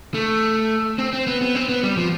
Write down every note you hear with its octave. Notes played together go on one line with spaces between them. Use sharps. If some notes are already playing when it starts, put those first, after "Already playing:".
A3
C4
C4
B3
B3
C4
B3
G3
F3